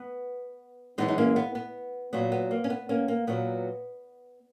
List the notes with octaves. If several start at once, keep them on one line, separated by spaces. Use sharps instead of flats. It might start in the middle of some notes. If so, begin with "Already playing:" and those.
Already playing: B3
F#2 E3 G#3 B3 D#4
D#4
A#3 C#4
B3
B3
A#2 F#3 B3
B3
A#3
C#4
B3
A#3 C#4
A#3
A#2 F#3 B3